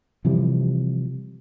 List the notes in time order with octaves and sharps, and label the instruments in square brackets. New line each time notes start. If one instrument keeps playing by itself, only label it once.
[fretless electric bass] C3 E3 F3 G3